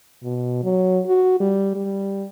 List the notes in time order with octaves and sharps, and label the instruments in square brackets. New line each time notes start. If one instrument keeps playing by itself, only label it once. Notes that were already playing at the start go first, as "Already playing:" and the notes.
[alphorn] B2
F#3
F#4
G3
G3